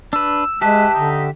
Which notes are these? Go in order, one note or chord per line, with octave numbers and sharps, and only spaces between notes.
D4 B4 E6
G#3 G4 B4 E5 A5
D3 D#4